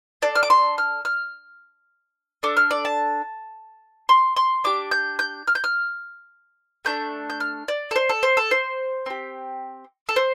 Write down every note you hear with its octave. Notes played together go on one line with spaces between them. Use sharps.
D4 A4 D5
F6
D6
C6
F6
F6
D4 A4 D6
F6
D5
A5
C6
C6
D4 G4 D6
G6
G6
F6
G6
F6
A3 D4 A4 G6
G6
F6
D5
A4
C5
A4
C5
A4
C5
C4 G4
A4
C5